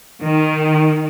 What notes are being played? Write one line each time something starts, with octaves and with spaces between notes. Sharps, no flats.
D#3